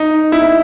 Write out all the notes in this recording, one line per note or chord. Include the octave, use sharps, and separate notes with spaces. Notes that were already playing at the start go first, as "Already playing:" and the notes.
Already playing: D#4
E4
E4